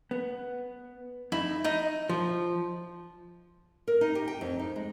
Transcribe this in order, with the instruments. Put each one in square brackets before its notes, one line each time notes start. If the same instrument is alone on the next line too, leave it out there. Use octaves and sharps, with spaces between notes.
[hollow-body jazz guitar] B3
[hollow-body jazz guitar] F2 D#4 [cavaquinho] E4
[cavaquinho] D#4 [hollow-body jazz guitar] D#5
[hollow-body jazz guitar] F3
[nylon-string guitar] A#4
D#4
G4
G5
F2
D#4
G#3